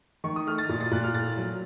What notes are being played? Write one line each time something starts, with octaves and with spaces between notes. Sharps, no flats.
D#3 C#6
D#6
A3 F6
A6
A#2
A6
A#2 F#6
F6
A2 A6
F#3